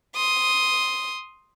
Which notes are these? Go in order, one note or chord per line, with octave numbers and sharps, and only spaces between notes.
C6 D#6